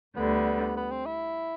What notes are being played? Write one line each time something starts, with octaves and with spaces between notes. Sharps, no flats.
D2 D3 G3 B3
B3
C4
E4